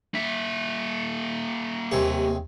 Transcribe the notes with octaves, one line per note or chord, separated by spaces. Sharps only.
A#3 E5
D#2 C3 G#4